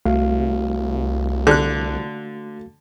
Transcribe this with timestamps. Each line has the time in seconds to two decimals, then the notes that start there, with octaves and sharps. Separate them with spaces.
0.05 C2 A3 F#4 F5
1.47 D3 F#6